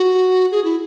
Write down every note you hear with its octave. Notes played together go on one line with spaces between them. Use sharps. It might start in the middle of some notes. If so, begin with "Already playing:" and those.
Already playing: F#4
G#4
E4